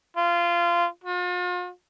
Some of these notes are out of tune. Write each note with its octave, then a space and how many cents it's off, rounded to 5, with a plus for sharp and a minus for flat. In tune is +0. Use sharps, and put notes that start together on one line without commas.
F4 -20
F4 +40